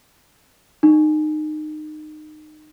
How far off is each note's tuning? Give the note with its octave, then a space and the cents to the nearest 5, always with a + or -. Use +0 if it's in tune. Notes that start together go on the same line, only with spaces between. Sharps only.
D#4 -25